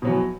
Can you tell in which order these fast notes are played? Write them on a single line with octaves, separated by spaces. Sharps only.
B2 F#3 E3